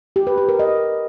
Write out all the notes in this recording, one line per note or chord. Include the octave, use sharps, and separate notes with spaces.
G4
B4
G4
A#4
D#5